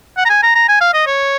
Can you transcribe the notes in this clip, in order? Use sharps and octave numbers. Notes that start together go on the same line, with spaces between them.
F#5
A#5
G#5
A#5
A#5
G#5
F5
D#5
C#5